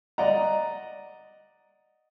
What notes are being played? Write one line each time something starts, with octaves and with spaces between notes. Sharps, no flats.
D5 D#5 F#5 A#5